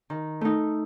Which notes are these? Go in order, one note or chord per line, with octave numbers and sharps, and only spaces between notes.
D#3
A3 D#4